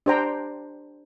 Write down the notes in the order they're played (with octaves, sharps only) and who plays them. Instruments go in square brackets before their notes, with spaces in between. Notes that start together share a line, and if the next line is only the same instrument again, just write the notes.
[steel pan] D4 G4 C5 G5 A#5